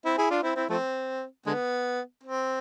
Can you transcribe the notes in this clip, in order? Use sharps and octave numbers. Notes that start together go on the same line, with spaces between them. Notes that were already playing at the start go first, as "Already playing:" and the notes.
C4 E4
E4 G#4
D4 F4
C4 E4
C4 E4
F3 A3 C4
D3 G#3 B3
C4